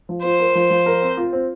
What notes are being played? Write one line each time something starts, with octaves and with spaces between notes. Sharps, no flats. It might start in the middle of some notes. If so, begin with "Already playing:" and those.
F3
F4 C5
A#4
F3
F3
A#4
C4
F4
C4